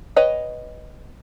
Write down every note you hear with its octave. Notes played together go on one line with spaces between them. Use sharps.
B4 C#5 D#5 G5